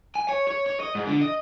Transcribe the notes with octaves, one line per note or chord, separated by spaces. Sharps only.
G#5
C#5
C#5
C#5
D#5
G#2
D3
D#5